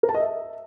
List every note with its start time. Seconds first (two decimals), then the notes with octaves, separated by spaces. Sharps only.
0.03 A#4
0.09 A5
0.14 D#5
0.20 E5